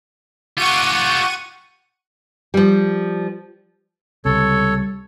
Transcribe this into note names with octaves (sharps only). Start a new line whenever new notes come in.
F4 G4 F#5 C#6 D#7
F3 G3
C#2 C3 G3 A4 C#5